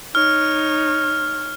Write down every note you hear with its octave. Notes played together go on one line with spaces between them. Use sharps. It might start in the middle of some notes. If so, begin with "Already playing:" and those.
D#4 C#5 F6